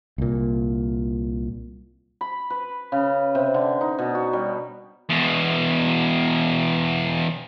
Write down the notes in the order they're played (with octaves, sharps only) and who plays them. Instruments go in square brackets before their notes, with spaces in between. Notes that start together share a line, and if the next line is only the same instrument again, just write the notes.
[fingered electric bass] C2 A#2
[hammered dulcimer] B5
B4
C#3
C3
D3
D#4
B2
F#4
G3
[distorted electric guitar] E2 B2